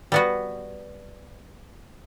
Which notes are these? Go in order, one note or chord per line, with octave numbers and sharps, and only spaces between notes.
G3 B3 F#4